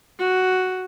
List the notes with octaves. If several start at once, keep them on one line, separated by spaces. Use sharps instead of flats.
F#4